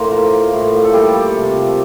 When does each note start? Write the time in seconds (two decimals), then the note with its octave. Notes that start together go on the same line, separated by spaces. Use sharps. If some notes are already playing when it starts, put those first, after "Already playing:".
Already playing: A2 A#3 A#4 C5
0.11 F3
0.32 A#3
0.53 A2
0.73 A#3
0.85 A4
0.93 G3 A3 G4
1.14 F3
1.35 C3
1.55 F3